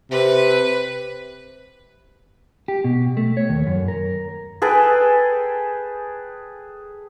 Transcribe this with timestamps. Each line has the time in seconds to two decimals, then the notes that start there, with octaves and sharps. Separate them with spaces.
0.11 C3 B4
2.68 G4
2.84 B2
3.17 A3
3.37 C#5
3.49 D#2
3.67 F#2
3.88 A#4
4.62 G#4 A4 B4 G5